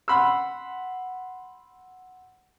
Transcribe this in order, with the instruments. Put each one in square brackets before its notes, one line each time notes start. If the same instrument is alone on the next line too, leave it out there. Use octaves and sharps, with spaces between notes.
[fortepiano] F#5 B5 C6 E6